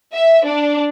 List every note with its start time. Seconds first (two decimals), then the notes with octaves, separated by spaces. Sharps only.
0.15 E5
0.46 D4